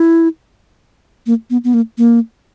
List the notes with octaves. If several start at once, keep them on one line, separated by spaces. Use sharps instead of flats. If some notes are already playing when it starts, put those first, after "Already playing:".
Already playing: E4
A#3
B3
B3
A#3
A#3